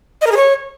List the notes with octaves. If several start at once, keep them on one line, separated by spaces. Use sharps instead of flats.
D#5
A#4
G#4
C#5